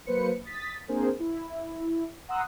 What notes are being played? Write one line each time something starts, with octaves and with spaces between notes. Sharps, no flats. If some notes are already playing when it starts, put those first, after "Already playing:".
F#3 A#3 B4 C5 C#7
D#6 A6 B6
A#3 C4 D4 G#4 A#4 C5
E4
F#5 A#5 C6 D#6 E6 F#6